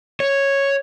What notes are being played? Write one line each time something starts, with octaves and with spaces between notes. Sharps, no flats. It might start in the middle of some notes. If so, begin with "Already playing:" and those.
C#5